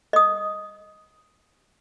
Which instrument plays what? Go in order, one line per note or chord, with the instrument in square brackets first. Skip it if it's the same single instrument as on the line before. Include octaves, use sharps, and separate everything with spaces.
[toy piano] D#5 D#6